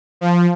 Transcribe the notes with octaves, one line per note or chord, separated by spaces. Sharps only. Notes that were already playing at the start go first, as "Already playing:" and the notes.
F3